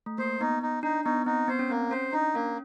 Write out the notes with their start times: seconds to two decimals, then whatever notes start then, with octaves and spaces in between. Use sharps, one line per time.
0.06 A3
0.18 A#3 C5
0.40 B3 D#4
0.63 D#4
0.83 D4 D#4
1.05 B3 D#4
1.26 C4 D#4
1.48 B3 C5
1.59 C#4
1.70 A#3 C4
1.91 C#4 C5
2.12 D4 D#4
2.35 A#3 C#4